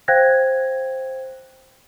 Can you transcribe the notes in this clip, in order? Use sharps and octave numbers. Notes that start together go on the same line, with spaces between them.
C5 F5 G5 F#6 G#6 A#6